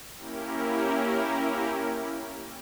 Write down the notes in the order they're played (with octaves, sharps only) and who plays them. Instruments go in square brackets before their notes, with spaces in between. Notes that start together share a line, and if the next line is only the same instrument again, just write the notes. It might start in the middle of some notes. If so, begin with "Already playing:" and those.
[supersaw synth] A#3 C#4 E4 G4 A#4